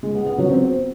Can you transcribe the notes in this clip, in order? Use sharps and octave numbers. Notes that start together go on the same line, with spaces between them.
G#3
B3
B3
F#3
C4